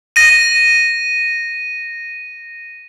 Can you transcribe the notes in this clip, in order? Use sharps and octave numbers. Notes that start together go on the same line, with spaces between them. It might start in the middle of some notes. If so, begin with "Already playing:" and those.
A#6 D#7